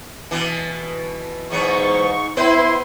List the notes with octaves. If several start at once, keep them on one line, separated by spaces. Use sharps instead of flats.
B2 E3
E2 G#2 B2 F#3 C#6
B3 E4 B4 C5 C6